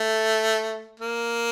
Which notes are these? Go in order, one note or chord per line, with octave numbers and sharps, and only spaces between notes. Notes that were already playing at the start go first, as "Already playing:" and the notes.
Already playing: A3
A#3